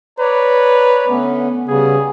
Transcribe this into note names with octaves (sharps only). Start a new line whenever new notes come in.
B4 C#5 D5 A#5
D3 A3 B3 C#4
C#3 G3 B3 G#4